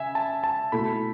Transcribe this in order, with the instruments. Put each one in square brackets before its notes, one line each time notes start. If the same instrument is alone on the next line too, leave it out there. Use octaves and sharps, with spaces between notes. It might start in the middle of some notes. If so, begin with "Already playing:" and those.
Already playing: [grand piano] C#3 [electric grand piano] E5 G#5
[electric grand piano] A5
A5
[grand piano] B2 A3 E4 A4 [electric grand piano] B5